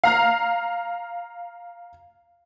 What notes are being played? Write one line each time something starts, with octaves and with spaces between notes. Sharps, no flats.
F5 A#5 F6